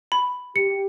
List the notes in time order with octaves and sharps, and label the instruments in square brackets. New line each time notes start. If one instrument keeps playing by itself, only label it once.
[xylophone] B5
[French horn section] G4 [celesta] C#7